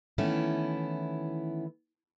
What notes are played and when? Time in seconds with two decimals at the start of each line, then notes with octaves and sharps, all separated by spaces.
0.18 D#3 E3 A3 B3 C#4 E4